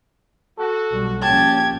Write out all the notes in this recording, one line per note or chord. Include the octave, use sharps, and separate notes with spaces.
F#4 A4
B1 G3
A#1 C#4 G4 G5 A5 G#6